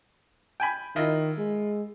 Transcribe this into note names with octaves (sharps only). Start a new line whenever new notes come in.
G5 G#5 B5
D#3 E4 F4 D#5
G#3